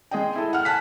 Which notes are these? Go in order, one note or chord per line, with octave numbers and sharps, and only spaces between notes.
G#3 G#4 D#5 G5
E4 A4
F#5 F6
G#5 A5 F6 F#6 B6